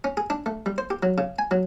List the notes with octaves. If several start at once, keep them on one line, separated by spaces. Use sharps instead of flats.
C#4
G#4
D4
A3
G3
C5
G4
F#3
C#3
G#5
F#3